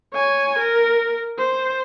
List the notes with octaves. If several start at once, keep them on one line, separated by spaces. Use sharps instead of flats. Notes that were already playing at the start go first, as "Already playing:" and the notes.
C#5 G#5
A#4
C5